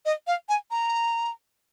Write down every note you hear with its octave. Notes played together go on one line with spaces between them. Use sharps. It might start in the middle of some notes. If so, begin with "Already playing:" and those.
D#5
F5
G#5
A#5